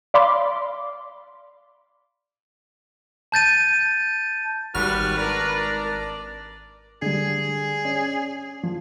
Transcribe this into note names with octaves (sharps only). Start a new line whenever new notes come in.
D5 F5 B5 C6 D6
A5 G6 A6 D#7
G#1 G3 F#4 B4 F6
D4 A#4 D5
D3 G3 G#4
C#4 D5
F3